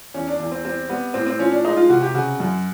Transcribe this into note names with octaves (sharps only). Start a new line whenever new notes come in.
E2 C#4
D4
E2
C4
G3 C4
G3 B3
A2 C4
C4
F3 C#4
D4
G#3 D#4
F4
C3 F#4
G4
C#3 F#4
F#2